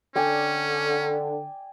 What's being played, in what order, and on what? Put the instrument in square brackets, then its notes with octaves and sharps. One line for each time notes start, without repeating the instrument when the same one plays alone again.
[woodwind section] D3 [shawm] C#4 [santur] D5 G5 G#5